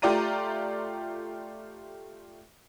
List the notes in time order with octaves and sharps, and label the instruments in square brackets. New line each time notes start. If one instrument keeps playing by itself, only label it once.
[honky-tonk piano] A3 F4 G4 D5 A#5 D#7